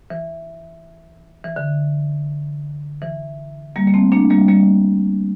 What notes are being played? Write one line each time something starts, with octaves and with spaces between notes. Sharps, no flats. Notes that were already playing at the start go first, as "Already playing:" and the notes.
E3
E3
D3
E3
G3 A#3
A#3
A3 C4
A#3 D4
G3 A#3
G3 A#3